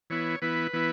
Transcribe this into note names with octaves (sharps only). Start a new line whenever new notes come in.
E3 B3 E4 C#5
E3 B3 E4 B4
E3 B3 E4